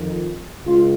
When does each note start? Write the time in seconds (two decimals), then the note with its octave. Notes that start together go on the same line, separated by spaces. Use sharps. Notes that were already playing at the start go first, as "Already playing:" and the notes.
Already playing: F2 D#3
0.66 C#2 F4